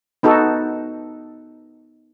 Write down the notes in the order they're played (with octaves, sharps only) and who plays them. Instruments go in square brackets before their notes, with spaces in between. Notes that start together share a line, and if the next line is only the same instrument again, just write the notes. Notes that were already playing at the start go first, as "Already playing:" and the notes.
[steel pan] B3 D#4 F#4 A4